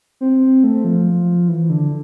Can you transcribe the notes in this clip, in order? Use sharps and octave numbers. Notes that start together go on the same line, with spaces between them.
C4
A3
F3
E3
D3